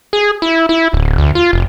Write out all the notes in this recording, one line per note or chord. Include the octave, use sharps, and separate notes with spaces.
G#4
E4
E4
D1
D2
F4
F1